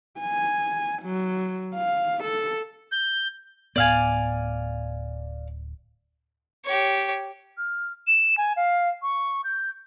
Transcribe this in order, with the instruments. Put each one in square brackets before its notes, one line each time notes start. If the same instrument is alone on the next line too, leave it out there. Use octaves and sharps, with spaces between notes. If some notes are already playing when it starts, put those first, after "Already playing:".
[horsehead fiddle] G#5
F#3
F5
A4
[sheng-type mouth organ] G6
[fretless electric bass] D1 A2 B3 [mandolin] D5 F5 G#5
[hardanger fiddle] G4 C#5
[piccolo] F6
E7
G#5
F5
C#6
G6